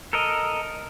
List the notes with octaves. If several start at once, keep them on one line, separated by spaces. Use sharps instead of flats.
A4 A#4 D#5